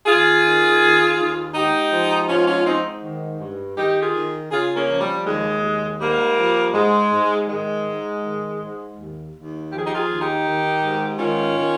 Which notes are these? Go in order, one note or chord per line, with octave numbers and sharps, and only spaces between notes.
D#2 F4 G#4
D#3
D#2
D#2
G#2 D#4 G4
F3
G#2 C#4 F4
C#4 F4
G#2 C4 D#4
D#3
G2
D#3 D#4 G4
F4 G#4
D#3
C#3 F4 G#4
A#3 C#4
F3
G3
D#2 G#3
D#2
G#2 G3 A#3
F3
G#2 G#3
G#2
D#3 G#3
G#2
D#3
G#2
D#2
D#2
F3 G4
G#4
D#4 G4
F4 G#4
D#2
D#4 G4
D#3
G#2
D#3 C#4 F4
D#3